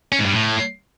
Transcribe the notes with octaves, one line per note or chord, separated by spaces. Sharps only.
C#4
G#2
G2
A2